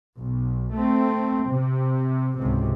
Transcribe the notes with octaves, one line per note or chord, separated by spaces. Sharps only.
B1
A3 C4
C3
G#1 C#2 C3